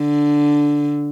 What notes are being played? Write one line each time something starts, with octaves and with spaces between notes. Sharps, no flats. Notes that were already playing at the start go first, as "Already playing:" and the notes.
Already playing: D3